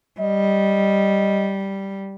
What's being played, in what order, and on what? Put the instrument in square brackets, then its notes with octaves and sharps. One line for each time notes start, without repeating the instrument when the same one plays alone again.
[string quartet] G3 [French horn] D#5